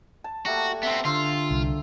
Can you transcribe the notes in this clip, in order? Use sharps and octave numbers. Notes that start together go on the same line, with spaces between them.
A5
G3 A3 A#3 F#4
B3 C4 E5
D3 F4 C5 E6
C2